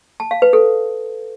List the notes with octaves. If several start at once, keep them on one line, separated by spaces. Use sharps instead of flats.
A5
F5
B4
A4